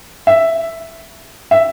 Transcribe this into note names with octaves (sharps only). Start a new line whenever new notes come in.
E5
E5